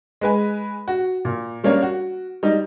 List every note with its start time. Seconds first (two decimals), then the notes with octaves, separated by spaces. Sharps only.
0.21 G#3 B4 G#5
0.88 F#4
1.25 A#2
1.64 G3 A#3 C#4 D4 A#4 C#5
1.82 F#4
2.43 G3 D#4